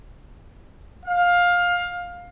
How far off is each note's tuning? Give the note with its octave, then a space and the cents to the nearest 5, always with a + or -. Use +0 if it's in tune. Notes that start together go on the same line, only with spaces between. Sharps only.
F5 +15